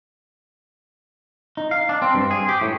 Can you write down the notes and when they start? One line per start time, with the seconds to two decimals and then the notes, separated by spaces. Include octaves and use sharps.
1.57 D#4
1.71 F5
1.89 D4
2.02 C4
2.15 G2
2.31 G#4
2.49 G4
2.61 A2